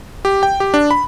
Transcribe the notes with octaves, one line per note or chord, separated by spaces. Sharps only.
G4
G5
G4
D4
B5